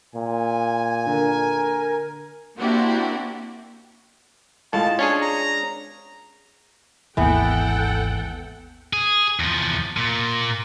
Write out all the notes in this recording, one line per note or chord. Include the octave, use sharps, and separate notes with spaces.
A#2 G#5
D3 A#4
A#3 C4 D4 E4 F#4 G4
A2 G#3 F4 A5
C#4 D4 G#4 C#5
A#5
G#1 D#2 E3 A#3 B3 A4 F#5 G5
G#4
E2 F3
A#2